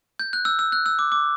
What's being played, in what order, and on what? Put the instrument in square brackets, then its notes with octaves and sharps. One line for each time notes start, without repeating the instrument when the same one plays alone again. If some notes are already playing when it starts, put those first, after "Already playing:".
[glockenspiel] G6
F#6
E6
E6
F#6
E6
D6
D6